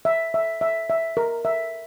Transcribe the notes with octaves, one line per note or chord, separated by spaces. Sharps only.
E5
E5
E5
E5
A#4
E5